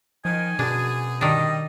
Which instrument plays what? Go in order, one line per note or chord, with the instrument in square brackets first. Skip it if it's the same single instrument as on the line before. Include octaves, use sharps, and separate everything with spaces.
[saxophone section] D#3 [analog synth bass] F3 [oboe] G#5
[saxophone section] F#2 B3 G#4 [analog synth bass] B2 [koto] D4
[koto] D#3 D4 [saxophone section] G3 [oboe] D#5